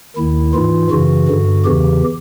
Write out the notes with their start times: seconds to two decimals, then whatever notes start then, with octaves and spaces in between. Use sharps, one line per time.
0.16 D#2 D#3 E4
0.54 G#2 E3 F4
0.91 F#2 C#3 E3 F#4
1.29 G2 D3
1.65 E2 C#3 E3 G4